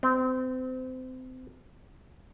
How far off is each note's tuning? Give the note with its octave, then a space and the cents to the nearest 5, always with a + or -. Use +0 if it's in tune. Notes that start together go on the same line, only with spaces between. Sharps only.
C4 -30